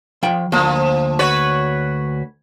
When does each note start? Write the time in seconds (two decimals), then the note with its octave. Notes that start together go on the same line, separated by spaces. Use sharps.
0.23 F3 G5
0.52 D2 F3 A#3
1.19 F#4 B4 C#5